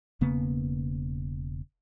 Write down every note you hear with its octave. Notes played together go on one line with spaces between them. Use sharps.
E1 C#3 A#3 B3